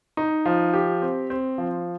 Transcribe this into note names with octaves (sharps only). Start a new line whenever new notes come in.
D#4
F3
G4
C4
C4
F3